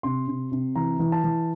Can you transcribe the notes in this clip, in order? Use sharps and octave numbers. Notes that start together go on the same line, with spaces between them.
C3 C6
C3
C3
E3 A#5
E3
A5
E3